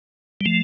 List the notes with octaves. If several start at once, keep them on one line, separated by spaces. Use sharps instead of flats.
G3
F3 A3